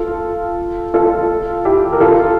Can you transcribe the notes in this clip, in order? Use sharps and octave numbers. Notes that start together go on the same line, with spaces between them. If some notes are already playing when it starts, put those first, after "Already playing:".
Already playing: F4 A4
F4 A4
E4 G4
A#4
F4 A4